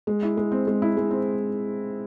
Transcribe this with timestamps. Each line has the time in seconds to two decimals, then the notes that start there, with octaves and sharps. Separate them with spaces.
0.07 G#3
0.23 E4
0.37 G#3
0.52 C4
0.67 G#3
0.82 E4
0.97 G#3
1.11 C4